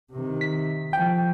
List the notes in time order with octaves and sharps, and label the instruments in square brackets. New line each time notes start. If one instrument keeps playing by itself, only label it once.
[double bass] C3 D#3
[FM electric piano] B6
[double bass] F3 [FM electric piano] G5